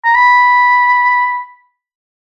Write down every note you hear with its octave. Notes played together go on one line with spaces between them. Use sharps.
A#5
B5